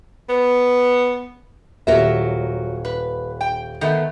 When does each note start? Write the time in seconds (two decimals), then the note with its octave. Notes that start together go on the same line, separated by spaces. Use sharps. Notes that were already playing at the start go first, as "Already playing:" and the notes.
0.29 B3
1.87 D#1 F#3 A#4 E5
2.85 B4
3.41 G5
3.81 D#3 A3 B3